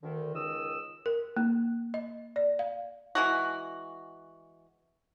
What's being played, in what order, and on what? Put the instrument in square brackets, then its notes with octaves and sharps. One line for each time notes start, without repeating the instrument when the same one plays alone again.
[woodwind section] D2 D3 D#3
C#2 D#3 D#6 E6
[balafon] A#4
A#3
D#5
D5
F5
[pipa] E3 G#3 F#4